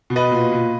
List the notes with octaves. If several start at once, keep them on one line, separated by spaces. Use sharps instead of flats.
B2
B4 D#5
A#2
A#2